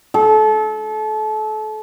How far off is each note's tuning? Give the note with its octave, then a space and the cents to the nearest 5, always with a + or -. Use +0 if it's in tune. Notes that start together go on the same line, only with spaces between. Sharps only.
A4 -30